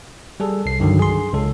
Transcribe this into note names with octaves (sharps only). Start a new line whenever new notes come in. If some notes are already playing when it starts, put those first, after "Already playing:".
G3 G#4 A4
C2 C7
G2 D3 D#3 F#3
G#4 C6
C#2 A4